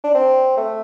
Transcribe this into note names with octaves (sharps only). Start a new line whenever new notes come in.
D4
C4
A3